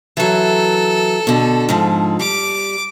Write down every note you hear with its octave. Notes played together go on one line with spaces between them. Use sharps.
E3 F#3 A4
B2 D3
G#2 D3 F3
G3 D6